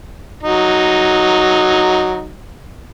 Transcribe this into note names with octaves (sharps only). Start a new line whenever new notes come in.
F#3 D#4